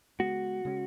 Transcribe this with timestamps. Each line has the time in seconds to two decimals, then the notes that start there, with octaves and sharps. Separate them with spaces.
0.19 C#3 G#3 B3 F#4
0.65 C#3 G#3 C#4